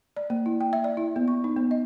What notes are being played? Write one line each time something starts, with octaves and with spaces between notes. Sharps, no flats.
D5
A#3
E4
G5
E5
D5
E4
B3
C#6
D#4
B3
D#5